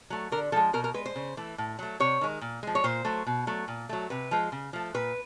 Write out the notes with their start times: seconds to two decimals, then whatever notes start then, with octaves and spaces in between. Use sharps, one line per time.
0.10 F#3 A3
0.32 D3 A#4
0.52 F3 G#3 A4
0.73 B2 A#4
0.84 A#4
0.94 G#3 B4
1.06 C5
1.16 C#3
1.37 E3 A3
1.58 A2
1.79 F#3 A3
2.00 C3 C#5
2.21 D#3 G#3
2.41 A#2
2.63 F3 G#3
2.75 C#5
2.84 A#2 C5
3.05 F#3 A3
3.27 B2
3.47 F#3 A3
3.68 A#2
3.89 F#3 A3
4.10 C3 B4
4.31 F3 G#3
4.52 C#3
4.73 F3 A3
4.94 A#2 B4